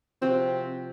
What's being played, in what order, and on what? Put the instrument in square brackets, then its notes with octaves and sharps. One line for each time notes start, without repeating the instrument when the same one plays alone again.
[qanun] C3 F3 F#4 [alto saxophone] C4